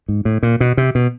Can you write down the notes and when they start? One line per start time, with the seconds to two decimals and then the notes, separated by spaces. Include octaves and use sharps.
0.08 G#2
0.25 A2
0.43 A#2
0.60 B2
0.77 C3
0.95 B2